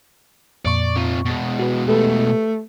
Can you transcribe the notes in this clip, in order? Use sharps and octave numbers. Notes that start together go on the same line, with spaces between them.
F2 A#2 D5 C#6
C3 F4
B2 G#3
F#4 B4
A3 G4 A4 B4